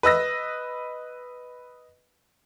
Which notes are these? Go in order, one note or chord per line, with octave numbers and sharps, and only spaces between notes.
B4 D#5 E6 A#6